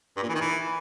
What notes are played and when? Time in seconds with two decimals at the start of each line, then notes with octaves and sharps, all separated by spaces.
0.17 G2
0.23 A#2
0.29 E3
0.35 D#3
0.41 E3